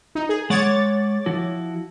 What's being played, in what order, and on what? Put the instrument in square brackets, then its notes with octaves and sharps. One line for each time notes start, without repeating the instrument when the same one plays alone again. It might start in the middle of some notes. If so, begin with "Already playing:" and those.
[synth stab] D#4
G#4
[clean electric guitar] G#3 F#5 [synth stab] C#5 D6 A6
[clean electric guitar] F3 E4 F#4